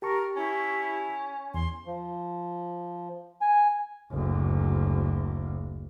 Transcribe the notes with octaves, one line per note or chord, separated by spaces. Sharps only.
G4 A#4 A5 C#6
C#4 E4
E2 C6
F3
G#5
F#1 D2